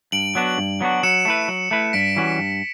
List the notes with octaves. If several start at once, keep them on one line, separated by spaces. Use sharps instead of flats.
G2 D7 F#7
F#3 B3 D4 F#4
G2
F#3 B3 D4 F#4
F#3 C#7 E7
A3 E4 B4
F#3
A3 E4 B4
G2 B6 D7
E3 G3 C#4 F#4 B6
G2